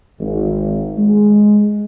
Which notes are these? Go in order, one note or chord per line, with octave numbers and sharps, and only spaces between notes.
G#1
G#3